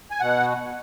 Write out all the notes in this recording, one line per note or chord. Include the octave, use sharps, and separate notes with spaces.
G#5
B2 F#5